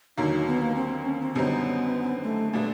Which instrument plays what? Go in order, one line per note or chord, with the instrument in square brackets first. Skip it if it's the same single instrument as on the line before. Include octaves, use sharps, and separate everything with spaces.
[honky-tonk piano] D#2 D3 F#3 A#3 [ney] D#4
[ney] B3
A#3
C4
C#4
C4
[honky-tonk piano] F#2 D3 G3 C4 D#4 [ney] B3
[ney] A3
[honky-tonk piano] A#2 G3 B3 D4 [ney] A3